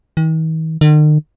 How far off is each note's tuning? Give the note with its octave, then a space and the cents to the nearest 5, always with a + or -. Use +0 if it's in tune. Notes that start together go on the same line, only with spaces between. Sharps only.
D#3 +45
D#3 -45